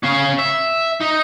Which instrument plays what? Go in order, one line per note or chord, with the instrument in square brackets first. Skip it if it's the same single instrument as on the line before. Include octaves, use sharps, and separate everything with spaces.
[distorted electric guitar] C#4 F5
E5
D#4